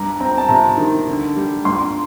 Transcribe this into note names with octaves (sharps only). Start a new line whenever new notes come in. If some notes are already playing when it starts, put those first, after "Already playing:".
Already playing: G2 A#5
C4 A#5
A5
C3 A#5
D#3
D3
G3
G2 C6